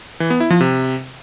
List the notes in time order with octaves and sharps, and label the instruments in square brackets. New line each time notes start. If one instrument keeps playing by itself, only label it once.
[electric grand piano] E3
B3
E4
F3
C3